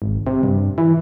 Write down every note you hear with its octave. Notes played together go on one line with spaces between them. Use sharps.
G#1
C3
G2
E3